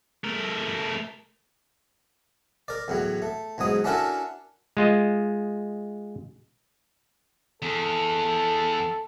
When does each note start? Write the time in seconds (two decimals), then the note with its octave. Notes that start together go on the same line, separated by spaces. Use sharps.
0.24 A3 A#4
2.68 A#4 D5
2.88 E2 A2 F#3
3.22 A3
3.58 E2 G#2 F#3 D#6
3.84 C#4 D4 E4 F#4 A4 A#4
4.77 G#3 F4 D#5
7.62 E2 A4